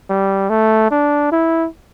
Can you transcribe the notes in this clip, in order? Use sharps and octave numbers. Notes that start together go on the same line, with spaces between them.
G3
A3
D4
E4